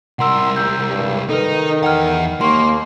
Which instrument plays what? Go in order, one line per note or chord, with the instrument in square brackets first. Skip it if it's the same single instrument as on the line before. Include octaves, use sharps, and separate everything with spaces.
[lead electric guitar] C2 A#4 [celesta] F#5 C6 E6
[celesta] E6 G6
[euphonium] G2
[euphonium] D#3 [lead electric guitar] D#4 [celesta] A4 B4
[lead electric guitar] E2 F#5 [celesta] G5 F6
[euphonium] D#2 [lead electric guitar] A#3 [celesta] C6 C#6